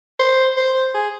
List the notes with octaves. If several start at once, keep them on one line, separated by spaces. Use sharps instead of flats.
C5
C5
G#4